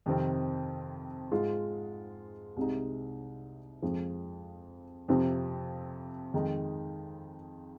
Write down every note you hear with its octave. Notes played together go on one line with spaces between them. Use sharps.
F2 C3 D#3 C4
G#2 G#3 F4
C2 C3 G#3 D#4
F2 F3 G#3
F2 C3 F3 C4
F2 D#3 G#3 D#4